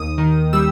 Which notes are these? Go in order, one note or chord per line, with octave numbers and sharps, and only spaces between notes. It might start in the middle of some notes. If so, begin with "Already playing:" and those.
Already playing: D#2 D#6
D#3
G3 E6